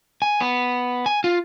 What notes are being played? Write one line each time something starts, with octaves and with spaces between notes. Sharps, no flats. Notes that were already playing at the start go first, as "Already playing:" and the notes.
G#5
B3
G#5
F4